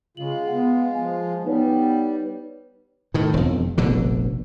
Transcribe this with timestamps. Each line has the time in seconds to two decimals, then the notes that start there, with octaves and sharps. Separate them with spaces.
0.17 C#3 G#3 F4 F#7
0.47 B3 F#5
0.95 F3 G#5
1.45 G3 B3 D#4 B4 C#5
3.14 A2 D#3
3.34 E1 F2
3.78 F1 A#1 B2 D3